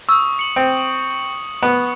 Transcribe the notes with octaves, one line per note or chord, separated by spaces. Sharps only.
C#6 D#6 E6
C#7 F#7
C4
B3